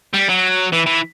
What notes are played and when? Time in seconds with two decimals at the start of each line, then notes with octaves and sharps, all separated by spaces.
0.14 G3
0.29 F#3
0.72 E3
0.86 E3